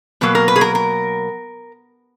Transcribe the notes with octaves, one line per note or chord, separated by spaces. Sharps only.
B2 F#3 A#3 B4
A#4
B4
G#4
A#4
A#4